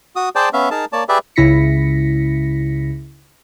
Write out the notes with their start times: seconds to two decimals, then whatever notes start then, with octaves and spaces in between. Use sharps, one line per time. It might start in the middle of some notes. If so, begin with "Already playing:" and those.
0.16 F#4 D#6
0.35 G#4 C5 D5 G5 A5
0.53 B3 C#4 E5 F5
0.71 D#4 G#4 A#4 A5
0.93 A#3 C#5 D5 A5
1.09 G4 G#4 B4 D5 E5
1.36 C#2 C#3 E4 A#6 B6 C#7